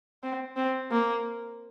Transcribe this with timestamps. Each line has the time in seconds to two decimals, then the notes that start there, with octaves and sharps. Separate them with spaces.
0.23 C4
0.57 C4
0.91 A#3